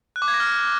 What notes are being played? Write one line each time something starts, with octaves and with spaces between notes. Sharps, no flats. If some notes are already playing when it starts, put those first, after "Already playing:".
F#6
D6
G#6
A#6
F6